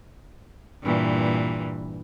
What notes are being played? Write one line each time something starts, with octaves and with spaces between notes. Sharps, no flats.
G2 A#2 E3